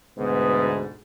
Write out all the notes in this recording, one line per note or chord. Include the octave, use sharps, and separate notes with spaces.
D2 G#2 B2 B3